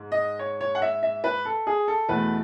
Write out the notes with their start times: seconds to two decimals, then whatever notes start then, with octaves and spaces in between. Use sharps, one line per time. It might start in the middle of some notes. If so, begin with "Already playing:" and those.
Already playing: G#2
0.12 D#5
0.39 C#5
0.61 C#5
0.75 F#5
0.82 E5
1.03 E5
1.24 B4
1.45 A4
1.67 G#4
1.88 A4
2.09 E2 B2 A3 B4